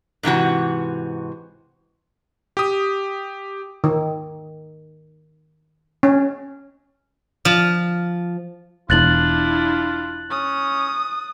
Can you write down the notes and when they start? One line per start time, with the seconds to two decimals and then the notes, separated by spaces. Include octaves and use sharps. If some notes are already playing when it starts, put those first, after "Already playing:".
0.23 G#2 C3 E3 F#4
2.57 G4 D#6
3.84 D#3
6.03 C#4
7.45 F3
8.90 E1 E2 D4 E4 F4 F#6 A6 F#7
10.31 C#4 D#6